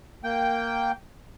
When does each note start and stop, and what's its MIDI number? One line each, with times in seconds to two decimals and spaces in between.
0.24 0.92 58
0.24 0.92 79